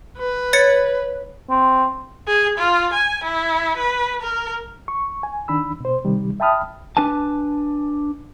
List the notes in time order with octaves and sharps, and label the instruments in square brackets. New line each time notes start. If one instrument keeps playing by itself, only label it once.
[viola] B4
[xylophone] C#5 A6 C#7
[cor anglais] C4
[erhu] G#4
F4
G#5
E4
B4
A#4
[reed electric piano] C#6
G#5
D#3 D4 B5 E6
B2 C5
C3 D#3 G3
E5 G5 A5 B5 D#6 F6
[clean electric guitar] D4 B4 G#5 A5